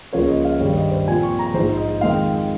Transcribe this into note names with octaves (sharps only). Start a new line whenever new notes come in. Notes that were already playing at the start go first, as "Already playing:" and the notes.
C#2 C#3 F3 A#3 C#5
D#5
F5
G#1 G2 G3 C#5
D#5
C5
A#2 F3 C4 F4 G#5
C#6
A#5
A#1 G#2 F3 C5
D#5
F2 D#3 G#3 C4 D#4 F5